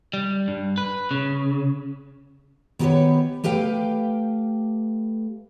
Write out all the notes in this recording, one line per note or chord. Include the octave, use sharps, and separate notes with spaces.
G3
G2
B4
C#3
D#3 B3 G4 A4 B4 C#5
A3 G4 B4 F5 G5